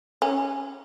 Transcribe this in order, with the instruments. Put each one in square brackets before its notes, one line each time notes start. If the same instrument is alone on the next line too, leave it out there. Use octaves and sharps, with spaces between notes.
[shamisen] C#4